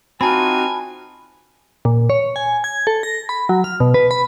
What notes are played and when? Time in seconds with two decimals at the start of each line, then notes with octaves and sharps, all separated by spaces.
0.21 C4 D#4 F4 F#4 G#5 A5 B5
1.85 A#2
2.10 C#5
2.36 G#5
2.64 G#6
2.87 A4
3.03 A#6
3.29 B5
3.49 F#3
3.64 F6
3.80 B2
3.94 B4
4.11 B5